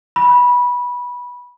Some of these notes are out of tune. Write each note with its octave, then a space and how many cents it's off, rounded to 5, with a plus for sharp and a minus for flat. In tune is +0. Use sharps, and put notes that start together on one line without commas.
B5 -15